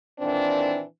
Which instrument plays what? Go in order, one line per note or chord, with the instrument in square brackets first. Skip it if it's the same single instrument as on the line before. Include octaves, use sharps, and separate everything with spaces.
[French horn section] A#2 D#3 E3 C4 D4